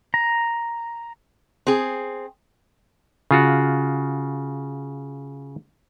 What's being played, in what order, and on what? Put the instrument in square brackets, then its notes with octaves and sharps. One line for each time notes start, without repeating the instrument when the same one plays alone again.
[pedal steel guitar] A#5
[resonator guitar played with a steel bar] C4 G#4
[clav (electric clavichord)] C#3 F4 F#4